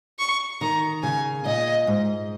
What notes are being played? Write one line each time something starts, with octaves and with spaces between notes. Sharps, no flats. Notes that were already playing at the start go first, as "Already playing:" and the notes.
C#6
D#3 A#5
C#3 G#5
A#2 D#5
G#2